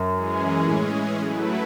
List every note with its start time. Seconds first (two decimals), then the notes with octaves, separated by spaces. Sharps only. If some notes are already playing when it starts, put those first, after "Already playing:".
Already playing: F#2
0.14 E3 G#3 C#4 G#4
0.67 A2
1.20 F#3 A3 E4 B4